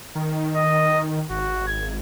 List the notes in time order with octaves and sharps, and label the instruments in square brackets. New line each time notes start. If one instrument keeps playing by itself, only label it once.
[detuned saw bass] D#3
[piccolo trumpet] D#5
[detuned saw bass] G#1 [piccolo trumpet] F#4
[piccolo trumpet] G#6